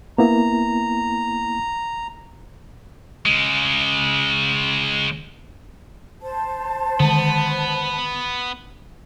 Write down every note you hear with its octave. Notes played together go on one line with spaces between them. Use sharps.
A#3 B3 E4 A#5
C#3 G#3
C5 A5
D3 D#3 G#3 B3